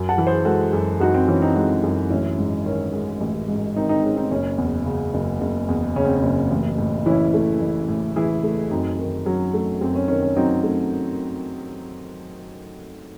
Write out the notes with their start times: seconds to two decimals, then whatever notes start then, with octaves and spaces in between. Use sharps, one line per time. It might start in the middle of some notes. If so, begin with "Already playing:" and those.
Already playing: F#2
0.09 F#5 A5
0.18 E3
0.27 G#4 C5
0.45 G#3 F#4 A4
0.73 F#2
1.00 F#2 D#4 F#4
1.14 C4
1.28 E3 C#4
1.42 C4 D#4
1.55 G#3 D#4 F#4
1.84 F#2
2.10 A1 C#4 E4
2.38 G#2
2.65 D#3 C#4
2.93 G#3
3.20 A1
3.48 G#2
3.76 D#3 C4 D#4
3.89 C4 D#4
4.03 G#3 C#4
4.16 C4 D#4
4.31 F#1 C#4
4.58 E2
4.85 C#3
5.14 F#1
5.41 F#1
5.68 E2
5.96 C#3 C#4
6.05 C4
6.16 C#4
6.23 F#1
6.51 A1
6.78 A2
7.06 E3 C#4 E4
7.34 A3
7.62 A1
7.88 A2
8.16 E3 E4 G#4
8.43 A3
8.71 F#2 C4 D#4
8.99 D#3
9.26 F#3 C#4
9.54 A3
9.81 F#2 C4
9.95 C#4
10.08 D#3 C#4
10.23 C#4
10.37 F#3 C4 D#4
10.63 A3